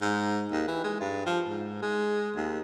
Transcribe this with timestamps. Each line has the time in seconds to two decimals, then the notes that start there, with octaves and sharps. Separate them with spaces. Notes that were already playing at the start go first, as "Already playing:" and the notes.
0.01 G#2
0.51 D#2
0.68 E3
0.84 G#3
1.00 G2
1.26 F3
1.49 G#2
1.82 G#3
2.36 D#2